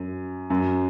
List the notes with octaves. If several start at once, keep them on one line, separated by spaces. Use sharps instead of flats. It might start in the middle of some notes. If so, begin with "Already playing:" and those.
Already playing: F#2
F#2